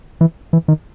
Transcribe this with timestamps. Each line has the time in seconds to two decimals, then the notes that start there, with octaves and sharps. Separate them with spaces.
0.21 E3
0.53 E3
0.68 D#3